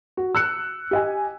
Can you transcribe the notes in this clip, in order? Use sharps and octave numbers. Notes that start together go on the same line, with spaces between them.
F#4
E6 F#6 C#7
G4 D#5 G#5